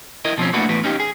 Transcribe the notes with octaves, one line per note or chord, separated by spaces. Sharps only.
E4 A#4 D#5
B2 F3 C4 C#4
A3 A#3 D4 E4 F#4 B4
E2 A2 B4
C#4 D#4 G4
G#4